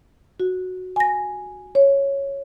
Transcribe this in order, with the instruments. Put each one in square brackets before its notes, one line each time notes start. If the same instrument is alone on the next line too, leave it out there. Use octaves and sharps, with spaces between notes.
[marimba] F#4
G#5 A#6
C#5